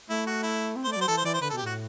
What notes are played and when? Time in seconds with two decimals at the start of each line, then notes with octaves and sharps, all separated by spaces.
0.09 A3 E4
0.27 F#4
0.43 E4
0.76 C4
0.84 C5
0.87 A3
0.92 D5
0.97 F#3 C5
1.08 E3 A4
1.17 C5
1.25 E3 D5
1.34 C5
1.41 D3 B4
1.50 A4
1.53 B2 G4
1.63 A2 F#4